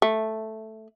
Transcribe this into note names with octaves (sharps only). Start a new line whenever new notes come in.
A3